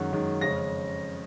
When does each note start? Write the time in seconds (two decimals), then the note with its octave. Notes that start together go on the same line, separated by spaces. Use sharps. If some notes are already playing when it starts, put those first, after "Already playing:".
Already playing: F#2 D#3 G#3 C#4
0.11 F#2 D#3 G#3 C#4
0.41 F2 C#3 G#3 C#4 A#6